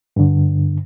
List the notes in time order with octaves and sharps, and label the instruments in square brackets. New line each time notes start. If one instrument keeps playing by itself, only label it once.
[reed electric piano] G2 D3